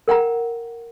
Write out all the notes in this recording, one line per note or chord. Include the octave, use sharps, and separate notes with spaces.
A#4 F#5 G5 A#5